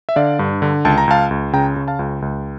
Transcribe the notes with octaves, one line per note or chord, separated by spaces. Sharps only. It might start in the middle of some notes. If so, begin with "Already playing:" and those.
E5
D3 D5 F5
G2
D3
C#2 A5
A#5
C#2 F5 A5
C#2
C#3 G5 A#5
C#3
F5 A5
C#2
C#2